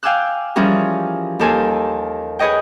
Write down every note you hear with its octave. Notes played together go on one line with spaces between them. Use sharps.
F5 G5 G#5 D6 E6 F#6
E3 F3 G3 C#4 G#4 A#4
D#2 G4 A4 A#4 G#5 C6
G#4 B4 C#5 D#5 G5